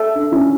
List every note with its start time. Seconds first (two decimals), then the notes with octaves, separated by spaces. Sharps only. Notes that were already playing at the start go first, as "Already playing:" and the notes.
Already playing: A4 E5
0.15 D4
0.32 C#4 E4